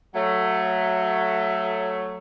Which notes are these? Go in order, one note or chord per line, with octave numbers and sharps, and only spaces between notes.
F#3 A3